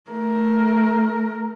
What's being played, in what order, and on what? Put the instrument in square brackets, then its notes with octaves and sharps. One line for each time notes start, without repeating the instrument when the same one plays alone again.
[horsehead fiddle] A3 A#4